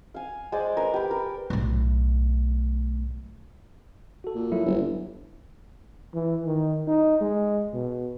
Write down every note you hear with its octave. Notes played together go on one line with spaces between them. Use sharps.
F5 G#5
G#3 C5 D5 G#5
A#4 B4
G4 B5
A#4
B1 A2
F#4 A4
A#2
F#3 E4 E5
G1
E3
D#3
D#4
G#3
B2